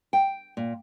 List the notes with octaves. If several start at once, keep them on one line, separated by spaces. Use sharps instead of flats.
G5
A#2